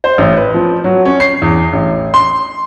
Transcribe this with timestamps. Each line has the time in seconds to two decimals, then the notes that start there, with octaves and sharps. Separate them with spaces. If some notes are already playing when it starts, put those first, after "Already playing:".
0.04 C5
0.18 A1
0.37 B4
0.54 F3
0.84 F#3
1.05 C#4
1.20 C7
1.42 E2
1.73 A1
2.14 C6